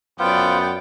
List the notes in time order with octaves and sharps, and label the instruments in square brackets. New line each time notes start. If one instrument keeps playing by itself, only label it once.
[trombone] F#2 [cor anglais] B3 [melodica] F4 C5 [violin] D5 G5